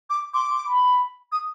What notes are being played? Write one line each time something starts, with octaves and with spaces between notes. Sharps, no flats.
D6
C6 D6
C6
B5
D#6